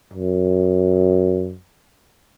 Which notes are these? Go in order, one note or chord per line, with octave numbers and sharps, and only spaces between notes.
F#2